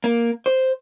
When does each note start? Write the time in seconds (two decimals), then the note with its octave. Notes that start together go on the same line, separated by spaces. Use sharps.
0.04 A#3
0.46 C5